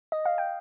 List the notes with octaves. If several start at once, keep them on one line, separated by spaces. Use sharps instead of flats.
D#5
F5
G5